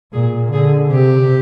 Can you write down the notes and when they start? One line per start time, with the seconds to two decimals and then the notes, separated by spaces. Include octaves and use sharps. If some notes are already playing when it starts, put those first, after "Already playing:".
0.13 A#2 G#4
0.52 D3 G#4
0.92 C3 G4